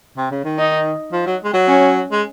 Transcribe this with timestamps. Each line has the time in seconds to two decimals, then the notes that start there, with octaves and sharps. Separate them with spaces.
0.17 C3
0.31 C#3
0.45 D#3
0.58 D#4
1.12 F3
1.27 F#3
1.44 G#3
1.54 F#3
1.68 C#4
2.11 G#3